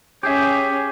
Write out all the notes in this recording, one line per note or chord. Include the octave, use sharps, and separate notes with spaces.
C#4 G4 G#4 E5